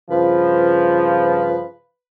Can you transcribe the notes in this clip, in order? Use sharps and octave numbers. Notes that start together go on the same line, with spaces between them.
G2 C#3 F3 B4